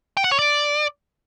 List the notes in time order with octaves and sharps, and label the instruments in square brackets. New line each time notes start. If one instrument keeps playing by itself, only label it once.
[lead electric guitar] G5
F#5
C#5
D5